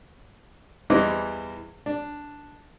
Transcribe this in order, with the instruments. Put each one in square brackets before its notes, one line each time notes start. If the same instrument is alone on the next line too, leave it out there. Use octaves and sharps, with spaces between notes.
[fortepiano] E2 E3 G3 C5 D#5 D6
D4